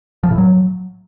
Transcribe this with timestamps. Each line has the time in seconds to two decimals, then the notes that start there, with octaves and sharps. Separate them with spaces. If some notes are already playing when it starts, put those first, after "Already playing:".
0.23 F3
0.31 A2
0.38 F#3